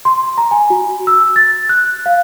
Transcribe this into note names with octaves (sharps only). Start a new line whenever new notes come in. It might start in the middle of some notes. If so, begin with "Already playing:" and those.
C6
A#5
G#5
F#4
E6
A6
F#6
F5